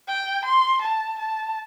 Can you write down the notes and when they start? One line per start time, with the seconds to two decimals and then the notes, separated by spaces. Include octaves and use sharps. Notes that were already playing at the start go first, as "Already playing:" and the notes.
0.08 G5
0.45 C6
0.82 A5
1.19 A5